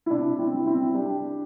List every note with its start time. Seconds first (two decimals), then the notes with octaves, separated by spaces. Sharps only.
0.06 E4
0.10 C3 D4
0.39 C4 E4
0.53 G3
0.66 C4 E4
0.94 G3 D4 G4